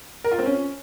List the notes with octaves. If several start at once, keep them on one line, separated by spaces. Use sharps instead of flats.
A#4
F4
C4
C#4